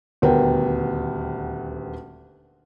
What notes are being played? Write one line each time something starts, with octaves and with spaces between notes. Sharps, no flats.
D#1 D2 B3 A#4 G5